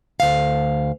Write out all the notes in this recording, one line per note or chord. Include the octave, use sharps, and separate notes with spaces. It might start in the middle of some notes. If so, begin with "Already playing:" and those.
D2 F5